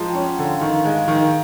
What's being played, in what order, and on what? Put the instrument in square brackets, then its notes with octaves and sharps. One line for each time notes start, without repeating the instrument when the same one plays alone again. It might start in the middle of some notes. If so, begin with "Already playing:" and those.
Already playing: [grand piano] F3 G#3 [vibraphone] A5 A#5 C6
[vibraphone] G5
[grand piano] C#4
[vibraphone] F#5
[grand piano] D3
[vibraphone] F5
[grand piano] D#3 [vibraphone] F5
[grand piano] G#3
D#3